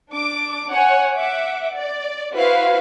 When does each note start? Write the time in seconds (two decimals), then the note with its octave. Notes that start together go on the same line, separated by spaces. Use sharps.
0.11 D4 D6
0.73 C#5 F#5 G#5
1.17 E5 F#5 D6
1.76 D5
2.35 E4 F#4 B4 C5 F5